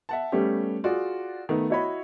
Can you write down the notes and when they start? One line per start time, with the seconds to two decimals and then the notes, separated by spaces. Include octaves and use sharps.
0.09 E5 F#5 A5
0.32 G3 A3 B3 C#4 G4
0.84 F4 F#4 G#4 D5
1.49 D#3 A3 B3
1.70 E4 F#4 C#5 D#5 B5